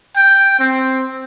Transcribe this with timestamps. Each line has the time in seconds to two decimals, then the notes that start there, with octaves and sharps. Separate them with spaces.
0.16 G5
0.59 C4